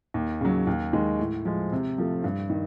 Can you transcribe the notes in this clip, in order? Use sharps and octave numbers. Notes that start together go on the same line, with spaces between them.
D#2
C#3 F#3
D#2
D#3 G#3
A2
F3 G#3
C3
F3 A3
G2
D#3